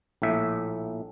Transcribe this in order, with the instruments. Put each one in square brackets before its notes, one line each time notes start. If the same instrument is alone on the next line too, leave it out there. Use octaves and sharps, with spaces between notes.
[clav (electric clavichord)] A#1 A2 E5